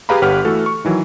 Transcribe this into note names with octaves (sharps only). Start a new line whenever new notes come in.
G4 G#4 B4 F5 A#5 B5
G1 G4 B4 C#5 F#5 F6
E3 A3 F#4 A4
C#6
D#3 E3 F#3